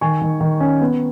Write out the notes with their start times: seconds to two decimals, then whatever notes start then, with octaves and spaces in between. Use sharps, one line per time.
0.01 D#3 G#5 C#6
0.21 D#3
0.41 D#3
0.60 C#4
0.81 B3